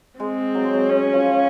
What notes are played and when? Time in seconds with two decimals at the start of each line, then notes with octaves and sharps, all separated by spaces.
0.20 G#3 C4
0.55 F#3
0.64 G#3
0.74 F#3
0.90 C#4
1.13 F3